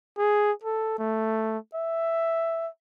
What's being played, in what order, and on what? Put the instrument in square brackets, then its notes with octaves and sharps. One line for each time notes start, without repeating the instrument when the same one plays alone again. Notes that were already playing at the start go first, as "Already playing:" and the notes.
[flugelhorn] G#4
A4
A3
E5